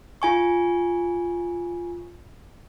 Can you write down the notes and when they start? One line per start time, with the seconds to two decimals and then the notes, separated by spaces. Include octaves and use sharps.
0.22 F4 G#5 C#6